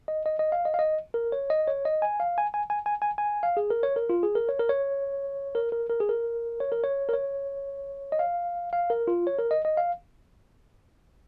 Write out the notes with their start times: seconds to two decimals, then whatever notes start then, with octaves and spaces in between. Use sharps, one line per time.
0.08 D#5
0.26 D#5
0.39 D#5
0.52 F5
0.65 D#5
0.74 F5
0.79 D#5
1.14 A#4
1.32 C#5
1.50 D#5
1.68 C#5
1.85 D#5
2.02 G#5
2.20 F5
2.38 G#5
2.54 G#5
2.70 G#5
2.86 G#5
3.02 G#5
3.18 G#5
3.43 F5
3.57 G#4
3.70 A#4
3.83 C#5
3.96 A#4
4.10 F4
4.23 G#4
4.35 A#4
4.49 C#5
4.59 A#4
4.69 C#5
5.55 A#4
5.72 A#4
5.90 A#4
6.00 G#4
6.09 A#4
6.60 C#5
6.72 A#4
6.84 C#5
7.09 A#4
7.13 C#5
8.12 D#5
8.19 F5
8.73 F5
8.90 A#4
9.08 F4
9.27 C#5
9.39 A#4
9.51 D#5
9.65 D#5
9.77 F5